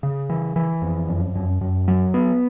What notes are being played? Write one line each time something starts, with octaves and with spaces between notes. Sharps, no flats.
C#3
E3
E3
F2
F#2
F#2
F#2
F#3
B3